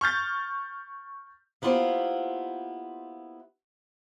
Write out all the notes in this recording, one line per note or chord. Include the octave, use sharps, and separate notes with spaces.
C#6 F6 G6 A6
A#3 B3 E4 F4 G4 C5